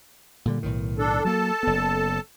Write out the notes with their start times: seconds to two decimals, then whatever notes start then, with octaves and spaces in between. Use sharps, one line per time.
0.45 A#2 D3 G3
0.63 B1 A2 D#3
0.99 D4 A4
1.25 F#3 A#3 A4 A5
1.63 F#1 B3